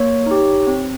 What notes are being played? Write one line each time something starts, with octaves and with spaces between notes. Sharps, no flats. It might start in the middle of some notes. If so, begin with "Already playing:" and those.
Already playing: A#3 C#5
D#4 G4
C4